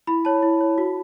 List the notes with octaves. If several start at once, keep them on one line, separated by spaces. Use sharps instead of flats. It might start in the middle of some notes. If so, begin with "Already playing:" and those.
E4 B5
C#5 A5
E4
C#5
F#4